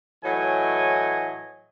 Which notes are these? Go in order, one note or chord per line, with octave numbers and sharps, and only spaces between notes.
A2 E3 F#3 D#5 G#5